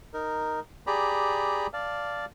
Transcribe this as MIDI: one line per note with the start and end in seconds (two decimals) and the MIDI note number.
0.14 0.60 63
0.14 0.60 70
0.87 1.67 67
0.87 1.67 68
0.87 1.67 74
0.87 1.67 82
0.87 1.67 83
1.73 2.25 74
1.73 2.25 77
1.73 2.25 81